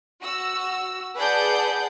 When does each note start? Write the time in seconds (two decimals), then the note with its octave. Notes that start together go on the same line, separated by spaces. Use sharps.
0.22 F#4 E6
1.16 G#4 B4 D5 F#5 A5 G6